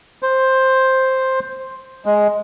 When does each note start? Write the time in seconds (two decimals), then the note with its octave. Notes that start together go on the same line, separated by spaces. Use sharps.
0.23 C5
2.06 G#3